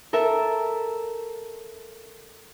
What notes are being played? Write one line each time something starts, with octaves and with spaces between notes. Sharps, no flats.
A4 A#4 E5